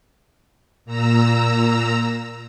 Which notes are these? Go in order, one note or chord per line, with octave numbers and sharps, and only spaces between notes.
A#2 A#5 E6